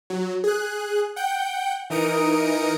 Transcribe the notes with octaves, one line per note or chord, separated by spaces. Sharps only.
F#3
G#4 F#6
F#5 G5 G6
E3 D#4 A#4 D#6 C#7 D7